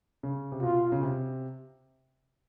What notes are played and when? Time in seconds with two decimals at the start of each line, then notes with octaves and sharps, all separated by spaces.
0.23 C#3
0.52 C3
0.63 B2 F4
0.92 C#3
1.03 C3